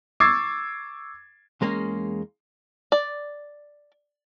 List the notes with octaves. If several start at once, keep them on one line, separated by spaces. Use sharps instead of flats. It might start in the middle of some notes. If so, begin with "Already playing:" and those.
C#6 D6 E6 G#6 A6 C7
E2 G#3 A#3 C#4
D5